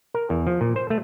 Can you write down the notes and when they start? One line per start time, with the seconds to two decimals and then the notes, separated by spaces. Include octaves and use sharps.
0.14 A#4
0.30 E2
0.47 F3
0.61 A#2
0.76 C5
0.90 A3